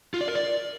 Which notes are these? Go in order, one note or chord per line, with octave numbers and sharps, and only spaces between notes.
F4
D5
A#4
D5